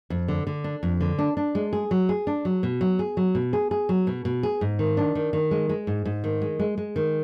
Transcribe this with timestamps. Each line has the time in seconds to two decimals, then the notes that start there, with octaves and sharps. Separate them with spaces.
0.10 F2
0.28 D3
0.47 D3
0.64 D4
0.83 F2
1.01 D3
1.19 D4
1.37 D4
1.55 G#3
1.73 G#4
1.91 F#3
2.09 G#4
2.27 D4
2.45 F#3
2.63 B2
2.81 F#3
2.99 G#4
3.17 F#3
3.35 B2
3.53 G#4
3.71 G#4
3.89 F#3
4.07 B2
4.25 B2
4.43 G#4
4.61 G#2
4.79 D#3
4.97 D4
5.15 D#3
5.33 D#3
5.51 G#3
5.69 G#3
5.87 G#2
6.05 G#2
6.24 D#3
6.42 G#3
6.59 G#3
6.78 G#3
6.96 D#3